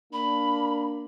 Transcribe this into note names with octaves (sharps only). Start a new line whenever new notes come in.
A#3 D4 B5